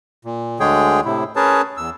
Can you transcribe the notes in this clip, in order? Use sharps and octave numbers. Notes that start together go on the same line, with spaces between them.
A#2
D2 D3 G#3 G#4 C#5 G5
A2 C3 E4
C#4 G#4 A#4 B4 C#5 A5
E2 E6